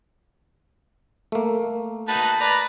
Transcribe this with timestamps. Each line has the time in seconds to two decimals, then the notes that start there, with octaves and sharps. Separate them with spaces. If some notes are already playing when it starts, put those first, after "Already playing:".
1.32 A3 A#3
2.08 D#4 F#4 B4 A5
2.41 B4 D5 A#5